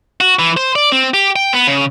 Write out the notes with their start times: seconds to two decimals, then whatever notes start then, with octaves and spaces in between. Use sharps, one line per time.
0.21 F#4
0.39 E3
0.57 C5
0.75 D5
0.92 C4
1.14 G4
1.36 G5
1.53 B3
1.67 C#3